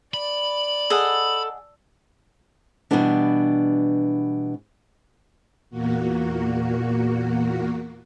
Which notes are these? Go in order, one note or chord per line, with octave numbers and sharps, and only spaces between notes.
D5 B5
G#4 A4 D#5 F#5
B2 D3 E3 G3 B3 D4
E2 A#2 A#3 F#4